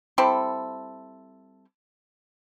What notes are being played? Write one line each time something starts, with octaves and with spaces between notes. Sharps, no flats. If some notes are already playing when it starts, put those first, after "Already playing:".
G3 C4 E4 A4